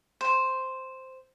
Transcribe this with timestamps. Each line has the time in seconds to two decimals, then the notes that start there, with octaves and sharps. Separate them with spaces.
0.21 C5